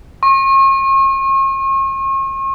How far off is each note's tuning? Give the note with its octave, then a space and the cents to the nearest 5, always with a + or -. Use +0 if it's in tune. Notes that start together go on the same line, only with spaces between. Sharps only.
C#6 -40